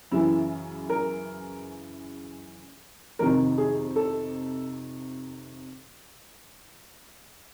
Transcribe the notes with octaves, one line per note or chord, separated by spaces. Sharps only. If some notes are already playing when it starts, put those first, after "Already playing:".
F#2 C#3 E3 E4
A#4
F2 C3 D#3 A#4
G#4
A4